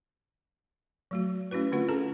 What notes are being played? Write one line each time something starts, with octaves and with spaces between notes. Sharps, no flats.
F#3 A3 F#4
A3 C#4 E4 F#4 B4
D3 A3 C4 F4 B4 F#5
C#4 G#4 A4 A5 A#5